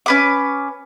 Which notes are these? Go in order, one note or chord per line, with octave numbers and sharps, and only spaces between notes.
C#4 B4 D6